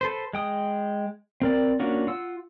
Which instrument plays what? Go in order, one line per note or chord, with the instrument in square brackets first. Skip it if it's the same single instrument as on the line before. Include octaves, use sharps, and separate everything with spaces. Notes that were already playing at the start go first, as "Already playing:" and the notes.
[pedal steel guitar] A4 B4 C5
G#3 G5 D#6
C4 A#4 D5
A#3 C#4 D4 F4 F#4
F4 F#5 E6